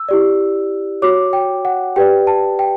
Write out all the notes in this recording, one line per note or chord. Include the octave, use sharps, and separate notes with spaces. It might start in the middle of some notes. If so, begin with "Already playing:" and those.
Already playing: E6
E4 G4 D5
F#4 C#5 D6
G5
F#5
G4 B4 D5 G5
A5
G5